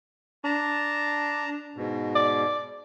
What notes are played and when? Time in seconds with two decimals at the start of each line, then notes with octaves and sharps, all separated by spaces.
0.44 D4 A5 A#5
1.76 G#2 B2
2.15 D5